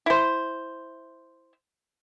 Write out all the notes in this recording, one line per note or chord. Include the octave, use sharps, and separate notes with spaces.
E4 C5